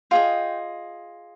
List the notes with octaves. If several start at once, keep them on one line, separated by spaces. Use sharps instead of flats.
F4 G#4 D#5 G5